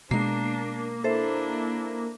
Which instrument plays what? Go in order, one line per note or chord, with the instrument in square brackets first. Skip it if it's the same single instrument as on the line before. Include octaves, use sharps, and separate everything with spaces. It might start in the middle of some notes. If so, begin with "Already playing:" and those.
[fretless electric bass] B2 G#3 [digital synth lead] A#3 [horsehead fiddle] D4 [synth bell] C7
[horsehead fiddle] D4 E4 [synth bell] A4 C5 E5